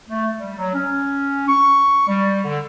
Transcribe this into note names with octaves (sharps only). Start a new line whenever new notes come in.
A3
G3
F#3
C#4
C#6
G3
D3